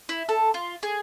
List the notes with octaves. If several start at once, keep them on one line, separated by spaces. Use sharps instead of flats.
E4
A4
F4
G#4